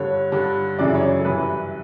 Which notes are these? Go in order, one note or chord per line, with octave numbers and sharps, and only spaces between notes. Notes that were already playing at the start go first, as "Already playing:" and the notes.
Already playing: G2 D3 C#5
G2 D3
F#2 C#3 E3 D5
C#5
C#5
A4
G2 E3 B4